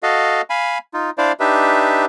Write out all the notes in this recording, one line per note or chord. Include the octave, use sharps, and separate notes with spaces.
F#4 A4 D#5 F5
F5 G#5 B5
D#4 F4
D4 E4 C5 D5 F5
D4 D#4 G4 B4 E5